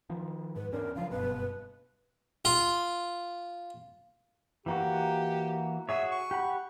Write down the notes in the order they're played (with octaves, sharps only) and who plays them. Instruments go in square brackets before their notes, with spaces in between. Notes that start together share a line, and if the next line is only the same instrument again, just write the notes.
[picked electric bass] D#3 F3
[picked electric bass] G#2 [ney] B4
[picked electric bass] E2 C#4 D4 [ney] A#4
[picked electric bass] C#3 F3 F#3 [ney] F5
[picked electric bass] F#1 G2 B2 [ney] B4
[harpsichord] F4
[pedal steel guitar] E3 A#3 F#4 [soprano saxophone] G4
[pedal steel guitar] F#4 G#4 C#5 [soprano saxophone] E5
[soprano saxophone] C#6
[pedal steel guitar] G4 F#5 B5